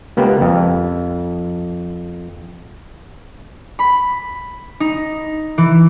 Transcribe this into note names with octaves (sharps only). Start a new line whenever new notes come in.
C#2 A#3 B3 G4
F2
B5
D#4
E3